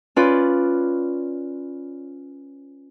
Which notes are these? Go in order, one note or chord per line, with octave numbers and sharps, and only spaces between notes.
C#4 F4 B4 D5